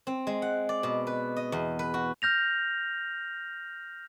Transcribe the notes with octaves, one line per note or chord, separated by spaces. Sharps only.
C4
G#3
F#5
D5
B2
B4
D#5
E2
B4
F#4
F6 G6 A#6 F7